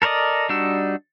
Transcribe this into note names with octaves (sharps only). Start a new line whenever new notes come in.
A4 A#4 C5 D5 D#5
G3 D4 D#4 F#4 E6